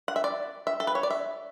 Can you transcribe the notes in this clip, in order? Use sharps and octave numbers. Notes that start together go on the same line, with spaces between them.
F#5
E5
D5
E5
A4
B4
C#5
D5
E5